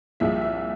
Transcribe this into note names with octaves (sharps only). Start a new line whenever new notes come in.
C2 A#2 F3 G#3 E5
E5